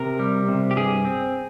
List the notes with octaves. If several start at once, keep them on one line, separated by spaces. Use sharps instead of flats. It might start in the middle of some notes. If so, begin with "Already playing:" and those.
Already playing: C3 A#4
G3
C3
G4
G2 G#4
C4